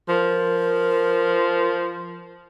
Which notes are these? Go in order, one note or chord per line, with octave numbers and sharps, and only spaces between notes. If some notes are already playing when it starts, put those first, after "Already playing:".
F3 A#4